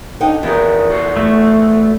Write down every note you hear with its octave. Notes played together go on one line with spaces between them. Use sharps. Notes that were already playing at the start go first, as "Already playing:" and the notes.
D3 D#4 G5
E2 D#3 B3 G#4 A#4
F#4 A4 C5
A3